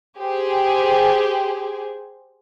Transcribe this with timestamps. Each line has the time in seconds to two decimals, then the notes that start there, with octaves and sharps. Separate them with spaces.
0.19 G4 G#4 C5